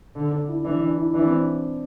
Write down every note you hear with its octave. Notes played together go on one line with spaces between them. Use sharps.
D3 D4
D4
E4
E3 D4
D4
E4
E3 D4
C4
D4